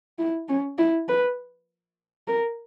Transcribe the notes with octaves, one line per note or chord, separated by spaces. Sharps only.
E4
C#4
E4
B4
A#4